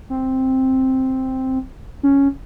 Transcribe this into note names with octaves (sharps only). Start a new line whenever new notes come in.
C4
C#4